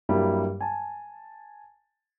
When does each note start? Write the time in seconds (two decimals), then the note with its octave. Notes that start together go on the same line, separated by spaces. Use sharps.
0.09 G2 F#3 G3 A#3 E4
0.61 G#5 A5